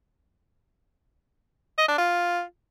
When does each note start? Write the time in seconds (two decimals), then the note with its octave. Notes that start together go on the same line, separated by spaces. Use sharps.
1.78 D#5
1.88 D4
1.98 F4